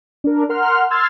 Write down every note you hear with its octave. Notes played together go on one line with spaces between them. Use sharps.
D4 A#4
A#4 F#5 C6 F6
C6 E6 F6 G#6 A6